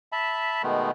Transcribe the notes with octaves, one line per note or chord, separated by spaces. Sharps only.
E5 A5 B5
B2 D#3 G#3 A3 B3